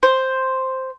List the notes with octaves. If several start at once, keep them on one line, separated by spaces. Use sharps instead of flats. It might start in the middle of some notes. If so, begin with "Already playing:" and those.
C5